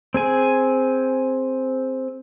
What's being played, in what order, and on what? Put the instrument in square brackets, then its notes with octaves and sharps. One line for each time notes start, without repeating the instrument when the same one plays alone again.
[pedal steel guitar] C4 G#4 G#5